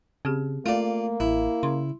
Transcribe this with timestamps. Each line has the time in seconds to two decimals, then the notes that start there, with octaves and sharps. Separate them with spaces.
0.25 C#3 C4 G4 G#4
0.66 A3 A#3 F4 D5 F5
1.20 A1 E4
1.63 C#3 C6